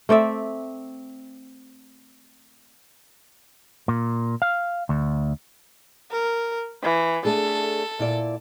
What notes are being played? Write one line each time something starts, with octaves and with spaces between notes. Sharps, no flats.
A3 C4 D5 E5
A#2
F5
D2
A#4
E3
A3 D4 G#4 A4
A#2 E4 D5